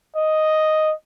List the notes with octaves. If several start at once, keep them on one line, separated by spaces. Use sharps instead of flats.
D#5